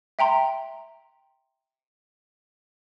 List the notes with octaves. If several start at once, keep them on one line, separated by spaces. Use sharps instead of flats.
E5 G5 A#5 C6